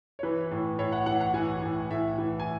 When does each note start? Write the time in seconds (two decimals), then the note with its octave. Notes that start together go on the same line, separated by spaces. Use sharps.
0.19 C#5
0.23 E3 B4
0.51 A2
0.79 A2 C#5
0.92 F#5
1.06 E3 F#5
1.21 F#5
1.34 E3 G#5
1.62 A2
1.91 A2 E5
2.18 E3
2.40 G#5